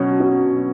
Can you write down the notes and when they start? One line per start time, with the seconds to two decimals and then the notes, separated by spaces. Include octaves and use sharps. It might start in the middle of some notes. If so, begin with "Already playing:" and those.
Already playing: B2 F#3 C#4
0.20 B2